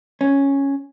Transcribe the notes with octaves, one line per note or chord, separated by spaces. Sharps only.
C#4